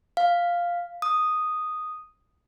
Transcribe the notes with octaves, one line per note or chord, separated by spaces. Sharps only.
F5
D#6